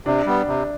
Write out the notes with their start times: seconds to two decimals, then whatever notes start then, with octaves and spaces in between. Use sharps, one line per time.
0.06 C3 D4
0.26 G3 B3
0.47 C3